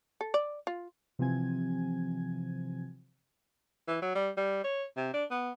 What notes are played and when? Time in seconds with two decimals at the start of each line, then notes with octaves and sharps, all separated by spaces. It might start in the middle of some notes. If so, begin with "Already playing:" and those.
0.21 A4
0.34 D5
0.67 F4
1.19 C3 E3 F3 C4 G#5 G#6
3.88 E3
4.02 F#3
4.16 G3
4.37 G3
4.64 C#5
4.97 C3
5.14 D4
5.31 B3